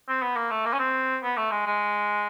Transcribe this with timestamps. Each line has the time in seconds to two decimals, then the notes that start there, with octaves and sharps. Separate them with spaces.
0.08 C4
0.22 B3
0.36 A#3
0.51 A3
0.65 A#3
0.74 C#4
0.79 C4
1.23 B3
1.37 A3
1.52 G#3
1.66 G#3